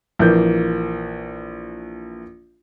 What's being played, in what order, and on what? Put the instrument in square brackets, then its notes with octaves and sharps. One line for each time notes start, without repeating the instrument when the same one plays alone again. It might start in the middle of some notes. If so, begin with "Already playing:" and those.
[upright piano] A#1 E3 A#3 G6